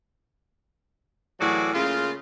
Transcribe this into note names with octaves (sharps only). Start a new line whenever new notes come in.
A2 E3 F#3 F#4 G#4 D5
C#3 A3 A#3 F4